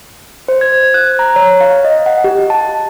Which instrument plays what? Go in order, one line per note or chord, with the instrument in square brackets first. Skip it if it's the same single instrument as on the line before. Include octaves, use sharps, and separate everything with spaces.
[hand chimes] C5
G#6
F#6
A#5
C#5
F5
D#5
F#5
G4
A5